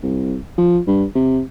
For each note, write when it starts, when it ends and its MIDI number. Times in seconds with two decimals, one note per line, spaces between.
0.03 0.36 36
0.58 0.80 53
0.87 1.04 43
1.15 1.40 48